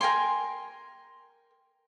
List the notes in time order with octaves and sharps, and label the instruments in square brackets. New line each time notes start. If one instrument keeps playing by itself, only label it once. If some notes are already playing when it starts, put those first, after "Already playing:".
[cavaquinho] A#4 G5 G#5 C6